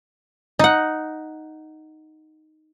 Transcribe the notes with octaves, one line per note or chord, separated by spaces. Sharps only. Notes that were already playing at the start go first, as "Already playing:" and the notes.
D#4 F#5